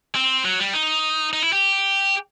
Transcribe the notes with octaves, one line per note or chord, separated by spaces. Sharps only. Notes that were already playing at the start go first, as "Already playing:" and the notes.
C4
F#3
G3
D#4
D#4
E4
G4